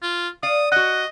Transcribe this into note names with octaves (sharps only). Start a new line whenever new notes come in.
F4
D5 F5 D#6
F#4 D#5 F#5 F#6